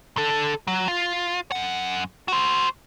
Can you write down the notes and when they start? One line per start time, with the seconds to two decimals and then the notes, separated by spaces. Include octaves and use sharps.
0.17 D3 A4
0.67 F#3
0.88 F4
1.52 F#2 F#5
2.28 F#4 C5